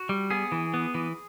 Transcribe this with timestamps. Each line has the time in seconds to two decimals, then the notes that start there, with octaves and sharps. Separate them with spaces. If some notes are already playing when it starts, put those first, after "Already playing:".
Already playing: F#4
0.09 G3
0.31 B3 G#4
0.52 E3
0.74 B3
0.94 E3